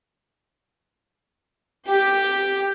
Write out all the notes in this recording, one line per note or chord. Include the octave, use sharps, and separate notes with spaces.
G4